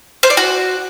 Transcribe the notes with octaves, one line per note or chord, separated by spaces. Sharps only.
C5
D5
F#4